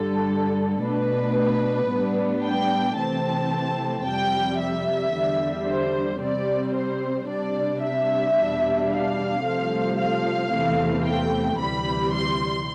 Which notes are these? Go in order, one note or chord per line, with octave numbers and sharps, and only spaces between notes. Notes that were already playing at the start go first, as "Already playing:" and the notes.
Already playing: G2 D3 G3 A4
B2 A3 D4 B4
A2 G3 B3 D4
G5
C3 E3 A3 C4 A5
F2 C3 G3 G5
E5
E2 D3 G3
C5
C3 G3 C4 D5
C5
C3 G3 D4 D5
E5
E2 B2 G3 D4
F5
C2 C3 F3 A3
F5
E2 C3 E3 A3 C4
G5
D2 C3 E3 G3 B5
C6